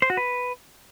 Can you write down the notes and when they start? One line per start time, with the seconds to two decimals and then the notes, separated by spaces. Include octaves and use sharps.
0.02 C5
0.10 F#4
0.17 B4